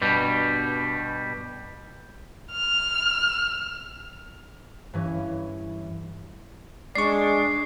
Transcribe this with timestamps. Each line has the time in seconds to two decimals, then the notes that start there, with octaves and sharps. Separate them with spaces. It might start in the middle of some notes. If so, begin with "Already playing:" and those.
0.02 G2 B2 G3
2.52 F6
4.93 G2 E3 C#4
6.95 G#3 D4 D5 C#6 C7